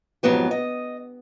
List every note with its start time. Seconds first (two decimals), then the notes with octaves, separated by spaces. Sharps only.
0.23 F2 G#2 F#3 B3 G4
0.51 D#5